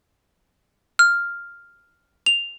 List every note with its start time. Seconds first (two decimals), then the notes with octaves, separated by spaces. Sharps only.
0.99 F6
2.26 F7